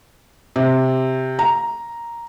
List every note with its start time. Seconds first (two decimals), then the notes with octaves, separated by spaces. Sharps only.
0.56 C3
1.39 A#5